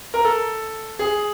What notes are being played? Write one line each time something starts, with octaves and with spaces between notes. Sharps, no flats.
A#4
A4
G#4